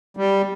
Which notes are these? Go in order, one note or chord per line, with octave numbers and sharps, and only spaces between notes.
G3